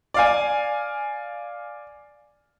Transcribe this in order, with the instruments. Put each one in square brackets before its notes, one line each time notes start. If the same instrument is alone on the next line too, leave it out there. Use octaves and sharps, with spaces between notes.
[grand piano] D5 F5 G#5